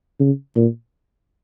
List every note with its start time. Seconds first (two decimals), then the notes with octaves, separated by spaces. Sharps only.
0.20 C#3
0.55 A#2